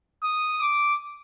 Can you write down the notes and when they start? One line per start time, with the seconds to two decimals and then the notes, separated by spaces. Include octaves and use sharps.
0.23 D#6
0.61 D6